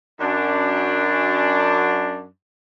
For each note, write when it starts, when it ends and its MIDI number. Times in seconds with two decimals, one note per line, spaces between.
0.19 2.26 42
0.19 2.26 62